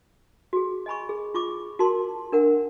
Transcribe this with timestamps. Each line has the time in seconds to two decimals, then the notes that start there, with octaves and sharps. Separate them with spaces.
0.53 F#4 G#4
0.86 D#5 G#5 B5 C#6
1.09 G#4
1.34 F4 C#6 D6
1.79 F#4 A#4 A5 C6
2.32 D4 A#4 F#5